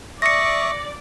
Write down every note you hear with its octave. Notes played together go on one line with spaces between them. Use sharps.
D5 E5 C#6 D#6 A#6 C#7